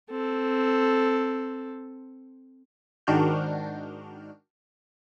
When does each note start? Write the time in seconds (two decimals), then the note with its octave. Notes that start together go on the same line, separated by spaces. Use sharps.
0.10 C4 A4
3.07 G#2 D#3 D4 F#4 F6 G6